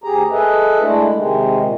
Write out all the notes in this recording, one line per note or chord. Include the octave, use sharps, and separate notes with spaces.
D2 G4 G#4 A#5
G#4 A4 B4 D#5 E5
G#3 A3 D4 E4
C3 D#3 G#3
A#2